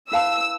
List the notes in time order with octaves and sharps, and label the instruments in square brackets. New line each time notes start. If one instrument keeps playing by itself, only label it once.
[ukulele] E4 B4 F5 A5 [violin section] E6